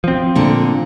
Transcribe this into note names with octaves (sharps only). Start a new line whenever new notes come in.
F3 C4
A#2 D3